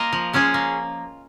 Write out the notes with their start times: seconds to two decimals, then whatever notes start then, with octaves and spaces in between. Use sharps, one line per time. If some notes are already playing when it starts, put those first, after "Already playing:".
Already playing: A#3 F4 A#4 D#5
0.13 F3
0.33 G#3 C#4 F4 G#4
0.54 A#3